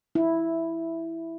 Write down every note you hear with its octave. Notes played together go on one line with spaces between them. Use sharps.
E4